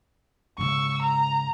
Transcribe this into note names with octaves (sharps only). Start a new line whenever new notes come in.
G#2 C#3 C#6 E6
A#5